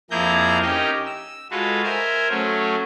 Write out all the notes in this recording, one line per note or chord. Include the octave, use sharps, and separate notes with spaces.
F2 A#3 E4 G#4 A#5 G6
C#4 D#4 G4 A#4 D#5
E6
G#3 F4 F#4 A4 B4
A#4 C5 E5 G#5
F#3 A3 C#4